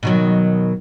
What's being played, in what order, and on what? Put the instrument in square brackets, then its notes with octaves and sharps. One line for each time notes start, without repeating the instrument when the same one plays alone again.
[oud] B2 D#3 F#3